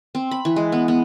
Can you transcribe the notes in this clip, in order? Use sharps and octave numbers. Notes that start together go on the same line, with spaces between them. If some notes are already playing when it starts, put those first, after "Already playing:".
C4
B5
E3
G#3
B3
B3